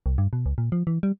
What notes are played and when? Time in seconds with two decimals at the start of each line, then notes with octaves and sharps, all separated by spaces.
0.06 C2
0.18 G2
0.33 B2
0.46 C#2
0.58 A#2
0.72 F3
0.87 E3
1.03 G3